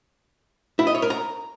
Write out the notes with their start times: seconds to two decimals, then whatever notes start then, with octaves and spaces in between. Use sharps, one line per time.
0.79 E4
0.87 D#5
0.95 C#5
1.02 A#4
1.10 A#5